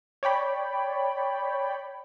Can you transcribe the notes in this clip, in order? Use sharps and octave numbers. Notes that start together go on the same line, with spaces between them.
C#5 D5 G5 B5